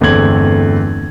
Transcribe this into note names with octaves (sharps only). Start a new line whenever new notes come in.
G1 E2 A3 C4 G#6 F#7